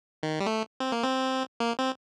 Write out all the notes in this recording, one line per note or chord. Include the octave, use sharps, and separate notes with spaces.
D#3
G3
A3
C4
A#3
C4
A#3
C4